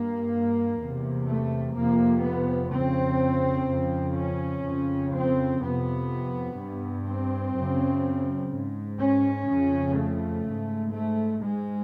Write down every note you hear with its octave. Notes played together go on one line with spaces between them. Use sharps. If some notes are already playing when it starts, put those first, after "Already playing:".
Already playing: G2 A#3
E2 C3
A3
F2 C3 A#3
B3
F2 C#3 C4
F2 C#3
C#4
F2 C#3
C4
F2 C3 B3
G2
C4
F#2 C#3
G#2
C#4
F2 C#3
A3
G#2
A3
G#2 G#3